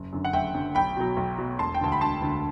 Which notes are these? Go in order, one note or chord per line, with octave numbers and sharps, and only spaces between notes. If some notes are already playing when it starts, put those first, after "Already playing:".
Already playing: F#1
F#2 D3
F#5
F#1 E5 G5
F#2 D3
B1 G5 B5
B2 F#3
B1
B2 F#3
E1 A5 C6
G5
D2 D3 A5
B5
E1 A5 C6
D2 D3